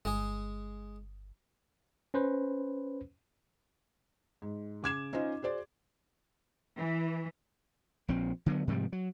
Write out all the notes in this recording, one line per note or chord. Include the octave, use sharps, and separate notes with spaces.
G1 G#3 G#4
C#4 B4 C5
G#2
C#3 D6 G#6 E7
C#4 D#4 F4 C5 D#5
F#4 G#4 C5 D5
E3
A#1 F3 C4
D3 F#3 B3
G#2 C3 F3 G3
F#3